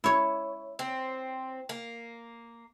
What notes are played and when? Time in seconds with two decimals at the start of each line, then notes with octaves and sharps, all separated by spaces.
0.04 E4 C#5
0.79 C4
1.69 A#3